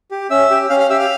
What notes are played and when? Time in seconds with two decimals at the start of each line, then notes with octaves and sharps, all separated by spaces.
0.11 G4
0.30 C#4 E5 E6
0.50 G4
0.70 C#4 F5 F6
0.80 F5 F6
0.90 G4 E5 E6
0.99 F5 F6